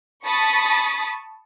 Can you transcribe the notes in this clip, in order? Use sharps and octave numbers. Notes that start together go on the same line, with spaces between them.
A5 B5 C#6 D#6 A6 B6